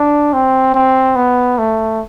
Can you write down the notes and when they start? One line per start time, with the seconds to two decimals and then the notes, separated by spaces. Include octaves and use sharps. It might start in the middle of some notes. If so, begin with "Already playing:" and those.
Already playing: D4
0.33 C4
0.74 C4
1.16 B3
1.58 A3